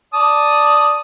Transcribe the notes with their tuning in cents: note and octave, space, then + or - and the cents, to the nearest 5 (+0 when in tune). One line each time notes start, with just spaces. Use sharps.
D5 +0 A5 +0 D#6 +0